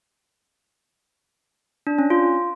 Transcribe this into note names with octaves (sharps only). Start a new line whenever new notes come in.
D4
C#4
F4